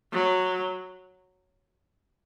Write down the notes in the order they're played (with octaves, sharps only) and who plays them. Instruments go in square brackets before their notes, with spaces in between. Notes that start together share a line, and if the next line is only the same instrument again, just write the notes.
[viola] F#3